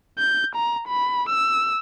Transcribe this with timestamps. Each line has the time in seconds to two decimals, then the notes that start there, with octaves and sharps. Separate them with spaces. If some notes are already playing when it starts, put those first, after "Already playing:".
0.19 G6
0.56 A#5
0.88 B5
1.30 E6